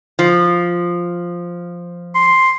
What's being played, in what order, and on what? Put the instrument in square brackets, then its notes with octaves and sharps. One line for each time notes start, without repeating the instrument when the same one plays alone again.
[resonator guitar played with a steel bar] F3
[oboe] C6